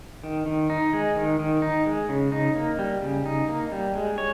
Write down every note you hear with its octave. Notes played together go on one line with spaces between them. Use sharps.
D#3
D#3
D#4
G#3
D#3
D#3
D#4
G#3
C#3
D#4
A#3
G3
C#3
D#4
A#3
G3
G#3
C#5